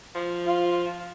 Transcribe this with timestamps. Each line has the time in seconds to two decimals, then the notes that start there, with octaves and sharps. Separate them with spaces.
0.15 F3
0.46 F4